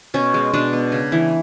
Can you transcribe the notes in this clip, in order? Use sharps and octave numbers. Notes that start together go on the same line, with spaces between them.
B2 C#4
G#3
B2 D4
B3
C#3
E3